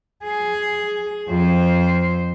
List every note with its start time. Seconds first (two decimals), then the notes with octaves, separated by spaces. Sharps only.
0.24 G#4
1.29 F2 C5